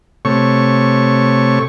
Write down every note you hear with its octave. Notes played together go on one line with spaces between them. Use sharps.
C3 A3 C#5 C#6